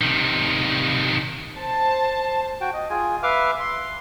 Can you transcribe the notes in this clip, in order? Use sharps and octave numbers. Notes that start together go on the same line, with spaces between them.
C3 D#3
C5 A5
F#4 G5
D#5
F4 G#4 G#5
B4 E5 F5 D6 F6
C6